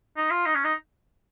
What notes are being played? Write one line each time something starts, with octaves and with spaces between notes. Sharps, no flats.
D#4
F4
D#4
C#4
D#4